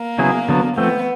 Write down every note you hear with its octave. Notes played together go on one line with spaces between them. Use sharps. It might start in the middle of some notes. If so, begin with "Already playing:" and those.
Already playing: A#3
C#3 F#3 B3 E4 G#4
D3 F#3 B3
F3 A3 B3 C4